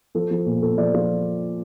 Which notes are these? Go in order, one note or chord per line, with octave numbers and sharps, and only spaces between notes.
F3 A4
F3
A#2
A#2 A4
F3 D5
F3 F4